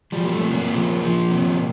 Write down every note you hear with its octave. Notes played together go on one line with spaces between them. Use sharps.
F3 G3
A#3
A3
C3
A#3
F3
F3
C3